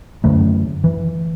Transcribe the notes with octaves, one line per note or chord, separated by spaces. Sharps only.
F#2 D3 A3
E3